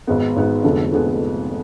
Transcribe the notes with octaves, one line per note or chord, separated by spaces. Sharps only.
G#1 G#2 G#3 B3
G#1 G#2 G#3 B3
F1 F2 D3 G#3 B3
F1 F2 D3 G#3 B3